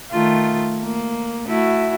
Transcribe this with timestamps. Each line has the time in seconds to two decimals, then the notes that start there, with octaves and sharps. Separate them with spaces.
0.11 D#3 A3 F4
0.82 A#3
1.47 A3 E4 F#4